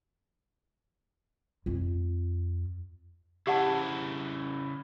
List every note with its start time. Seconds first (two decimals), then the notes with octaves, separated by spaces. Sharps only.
1.66 F2 F4
3.47 C#3 E4 G4 F#5 A5